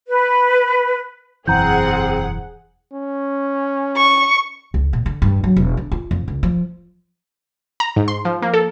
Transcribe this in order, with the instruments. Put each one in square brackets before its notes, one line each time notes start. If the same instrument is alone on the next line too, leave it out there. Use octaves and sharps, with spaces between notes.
[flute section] B4
[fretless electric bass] E1 F#2 E3 [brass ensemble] C4 [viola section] G#4 F#5 [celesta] A#5 G6
[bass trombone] C#4
[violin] C#6
[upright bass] C#2
A#2
D3
G2
F#3
E1
D3
F4
F2
C#2
F3
[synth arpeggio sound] A#5
G#2
C6
F3
A#3
A4